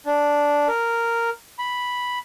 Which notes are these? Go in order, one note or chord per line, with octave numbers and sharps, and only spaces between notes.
D4
A#4
B5